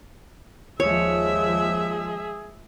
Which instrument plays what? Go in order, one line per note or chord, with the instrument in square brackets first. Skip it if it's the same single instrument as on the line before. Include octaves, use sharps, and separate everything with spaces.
[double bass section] D#2 F3 G#3 [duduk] G#4 [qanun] C#5 [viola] E5